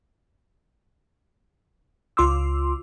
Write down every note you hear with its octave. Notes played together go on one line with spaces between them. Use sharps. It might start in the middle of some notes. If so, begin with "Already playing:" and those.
C#2 F4 C6 D6 E6